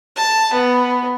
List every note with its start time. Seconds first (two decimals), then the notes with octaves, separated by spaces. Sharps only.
0.16 A5
0.53 B3